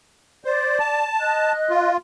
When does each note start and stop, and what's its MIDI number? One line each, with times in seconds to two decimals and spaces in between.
0.45 0.78 72
0.45 1.06 74
0.80 1.52 81
1.20 1.89 75
1.20 1.89 90
1.70 1.97 65